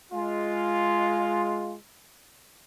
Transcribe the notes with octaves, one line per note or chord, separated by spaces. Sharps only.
G#3 F4